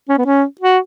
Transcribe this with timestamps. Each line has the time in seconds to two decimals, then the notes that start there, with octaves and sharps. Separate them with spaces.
0.09 C#4
0.18 B3
0.26 C#4
0.61 F#4